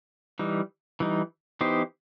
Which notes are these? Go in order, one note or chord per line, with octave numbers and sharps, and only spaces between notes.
E3 G3 D#4
E3 G3 D#4
E3 B3 D#4 G4 C5